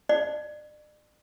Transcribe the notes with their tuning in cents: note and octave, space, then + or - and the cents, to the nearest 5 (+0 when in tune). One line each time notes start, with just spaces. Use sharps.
D5 +40